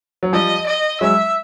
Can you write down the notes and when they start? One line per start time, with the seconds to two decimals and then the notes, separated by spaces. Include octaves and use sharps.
0.23 F#3
0.33 F3 G3 D#5
0.67 D#5
1.01 F#3 G#3 E5